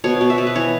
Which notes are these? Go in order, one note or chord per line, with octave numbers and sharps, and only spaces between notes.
B2 C#5
B2
E5
B2
B4
E3 C#5